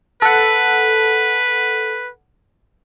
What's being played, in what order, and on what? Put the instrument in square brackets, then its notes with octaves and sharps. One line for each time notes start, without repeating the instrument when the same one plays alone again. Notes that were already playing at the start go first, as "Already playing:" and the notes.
[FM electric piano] A4 F#5 [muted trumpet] B4